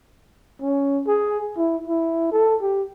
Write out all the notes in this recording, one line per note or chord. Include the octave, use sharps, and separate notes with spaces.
C#4
G#4
E4
E4
A4
G4